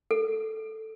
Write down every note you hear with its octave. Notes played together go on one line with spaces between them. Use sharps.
A4